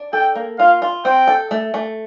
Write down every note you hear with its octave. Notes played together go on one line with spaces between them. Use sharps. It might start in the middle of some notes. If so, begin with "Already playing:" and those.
Already playing: D4
A4 G5
A#3
F4 F5
F4
C4 G5
A4
A3
A3